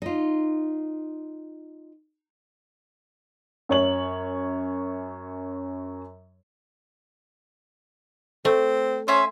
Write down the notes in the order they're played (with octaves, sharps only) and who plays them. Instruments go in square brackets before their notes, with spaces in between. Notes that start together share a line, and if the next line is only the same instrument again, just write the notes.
[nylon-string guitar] D#4 F4
[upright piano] F#2 C#5 F#7
[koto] A3 [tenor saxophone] C4
[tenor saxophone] C#4 [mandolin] C5 E5 G#5